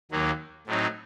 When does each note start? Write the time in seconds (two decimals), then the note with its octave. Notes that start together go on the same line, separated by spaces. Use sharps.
0.11 D#2 D#3 F#3 A#3
0.67 A2 F#3 C4 D#4